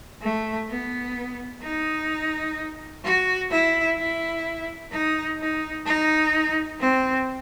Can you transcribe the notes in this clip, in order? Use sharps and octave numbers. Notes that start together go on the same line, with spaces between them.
A3
B3
D#4
F#4
E4
E4
D#4
D#4
D#4
C4